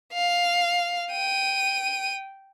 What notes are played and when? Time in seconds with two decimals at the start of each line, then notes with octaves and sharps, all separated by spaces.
0.13 F5
1.12 G5 D#7